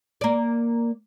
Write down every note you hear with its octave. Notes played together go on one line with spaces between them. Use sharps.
A#3 D5